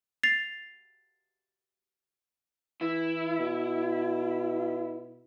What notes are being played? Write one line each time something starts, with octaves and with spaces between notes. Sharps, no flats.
A6 C7 F7
E3 E4
B2